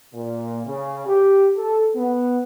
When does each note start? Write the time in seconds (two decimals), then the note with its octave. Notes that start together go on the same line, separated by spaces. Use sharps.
0.14 A#2
0.66 C#3
1.07 G4
1.57 A4
1.95 B3